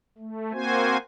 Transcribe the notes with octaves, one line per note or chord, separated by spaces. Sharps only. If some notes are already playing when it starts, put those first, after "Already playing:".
A3
A#3 C4 F#4 C5 G#5